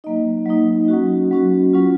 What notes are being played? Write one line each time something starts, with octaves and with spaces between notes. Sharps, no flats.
F#3 A#3 D#4 D#5
F#3 A#3 D#4
F#3 C#4 F#4
F#3 C#4 F#4
F#3 C#4 F4